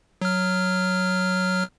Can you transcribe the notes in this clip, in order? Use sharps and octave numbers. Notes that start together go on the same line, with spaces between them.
F#3 F6